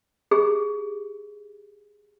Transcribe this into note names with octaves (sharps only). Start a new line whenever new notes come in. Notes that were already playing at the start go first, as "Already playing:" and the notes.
G4 G#4